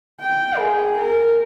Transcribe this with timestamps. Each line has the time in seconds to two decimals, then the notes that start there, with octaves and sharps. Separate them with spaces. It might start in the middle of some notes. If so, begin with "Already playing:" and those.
0.21 G5
0.58 G#4
0.97 A#4